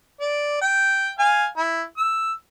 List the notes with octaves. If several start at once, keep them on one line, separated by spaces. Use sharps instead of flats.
D5
G5
F5 G#5
E4
E6